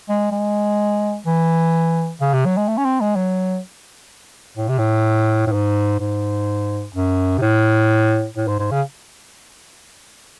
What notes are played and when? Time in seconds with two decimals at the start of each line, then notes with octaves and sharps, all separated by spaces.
0.09 G#3
0.32 G#3
1.26 E3
2.21 C#3
2.34 C3
2.46 F#3
2.57 G#3
2.68 A3
2.78 C#4
2.85 C4
3.01 G#3
3.16 F#3
4.57 A2
4.69 C3
4.79 A2
5.47 A2
5.53 G#2
6.00 G#2
6.95 F#2
7.38 C3
7.42 A2
8.37 A2
8.48 G#2
8.59 G#2
8.71 C#3